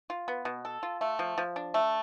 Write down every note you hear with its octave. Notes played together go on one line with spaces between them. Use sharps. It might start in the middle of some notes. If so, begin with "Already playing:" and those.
F4
B3
B2
A4
F4
A3
F3
F3
D4
A3